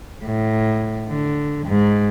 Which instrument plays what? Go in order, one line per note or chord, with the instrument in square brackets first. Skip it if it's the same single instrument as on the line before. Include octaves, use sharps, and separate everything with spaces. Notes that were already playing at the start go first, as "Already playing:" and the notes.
[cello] A2
D3
G#2